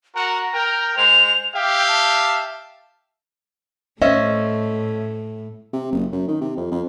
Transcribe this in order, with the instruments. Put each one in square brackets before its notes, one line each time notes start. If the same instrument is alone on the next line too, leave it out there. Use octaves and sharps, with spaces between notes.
[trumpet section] F#4 A#4 F#5 [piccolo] A#5
[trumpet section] A#4 G5
[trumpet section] G#3 C5 [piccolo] F7
[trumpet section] G4 E5 F5 [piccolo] G5
[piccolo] A5
[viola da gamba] A2 A3 [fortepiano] C4 C#4 [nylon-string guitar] D#5 E5
[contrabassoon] C3
F#1
F#2
D#3
C3
F2
F2